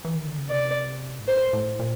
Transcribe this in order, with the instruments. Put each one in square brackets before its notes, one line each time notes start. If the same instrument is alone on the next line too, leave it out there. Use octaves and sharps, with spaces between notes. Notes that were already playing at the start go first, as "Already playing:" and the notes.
[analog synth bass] E3
D#3
D3
C#3
[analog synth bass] C3 [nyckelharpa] D5
[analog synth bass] G#2
[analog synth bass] A2 [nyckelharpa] C5
[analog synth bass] A2
A#2